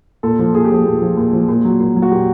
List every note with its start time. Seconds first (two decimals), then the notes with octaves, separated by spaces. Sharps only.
0.23 A#2 A4
0.39 F3
0.55 A#2 G#4
0.64 G4
0.71 F3 G#4
0.86 A#2
1.02 F3
1.17 A#2
1.33 F3
1.48 A#2
1.65 F#3
1.80 A#2
1.96 F#3
2.02 F#4
2.12 A#2 G4